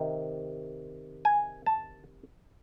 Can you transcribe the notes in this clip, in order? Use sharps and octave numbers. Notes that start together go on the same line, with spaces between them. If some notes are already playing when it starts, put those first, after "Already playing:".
Already playing: C3 D#3
G#5
A5